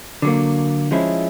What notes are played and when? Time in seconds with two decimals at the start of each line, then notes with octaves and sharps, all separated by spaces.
0.22 D3 F#3 A#3
0.91 F3 G#3 C#4 E4